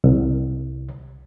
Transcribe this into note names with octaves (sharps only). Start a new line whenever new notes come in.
C2